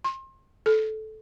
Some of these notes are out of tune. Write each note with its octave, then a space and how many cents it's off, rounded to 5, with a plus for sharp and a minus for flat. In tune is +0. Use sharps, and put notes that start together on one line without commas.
C6 +30
A4 -15